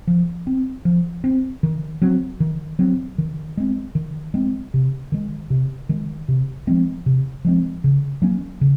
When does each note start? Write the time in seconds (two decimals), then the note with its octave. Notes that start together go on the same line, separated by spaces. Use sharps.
0.07 F3
0.47 C4
0.85 F3
1.24 C4
1.63 D#3
2.02 F#3 C4
2.40 D#3
2.79 F#3 C4
3.18 D#3
3.57 G#3 C4
3.95 D#3
4.34 G#3 C4
4.74 C3
5.12 D#3 G#3
5.50 C3
5.89 D#3 G#3
6.28 C3
6.67 F3 G#3 C4
7.06 C3
7.45 F3 G#3 C4
7.84 C#3
8.22 F#3 A#3 C#4
8.61 C#3